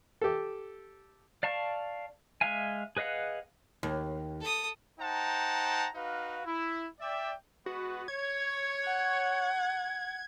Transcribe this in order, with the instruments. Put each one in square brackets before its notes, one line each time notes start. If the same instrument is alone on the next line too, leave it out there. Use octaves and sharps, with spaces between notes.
[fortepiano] G4 A4
[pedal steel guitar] D5 F5 A5 C#6
G#3 E5 F5 G#5
G#4 B4 D#5 F5 F#5
[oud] D#2
[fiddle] A4 D#6
[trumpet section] D#4 C5 F#5 G5 A5 A#5
D#4 F#4 B4 F5
E4
D5 E5 G5
[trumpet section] G#3 B3 B4 [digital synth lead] F#4
[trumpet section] C#5 [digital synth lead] G#6
[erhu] F#5